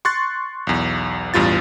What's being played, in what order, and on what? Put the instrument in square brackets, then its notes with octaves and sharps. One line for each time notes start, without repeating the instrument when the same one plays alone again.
[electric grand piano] C6 C#6 F#6 A6
B1 E2
A1 E2 G2 F4 A6